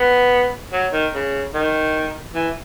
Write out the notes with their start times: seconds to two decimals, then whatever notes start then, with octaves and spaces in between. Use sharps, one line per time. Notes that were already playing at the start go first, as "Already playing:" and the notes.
Already playing: B3
0.73 F#3
0.93 D#3
1.14 C#3
1.54 D#3
2.35 E3